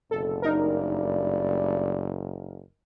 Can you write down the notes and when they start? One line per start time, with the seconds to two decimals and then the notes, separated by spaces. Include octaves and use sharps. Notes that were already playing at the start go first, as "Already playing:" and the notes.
0.11 F#1 B2 D3 A4
0.42 G2 A3 D#4 A#4 D5